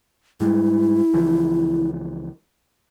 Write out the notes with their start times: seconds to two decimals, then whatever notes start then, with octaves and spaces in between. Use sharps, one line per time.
0.40 G#2 G3 G#3 E4
1.13 C#2 E3 F3